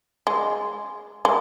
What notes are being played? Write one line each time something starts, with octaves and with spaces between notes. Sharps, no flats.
G#3
G#3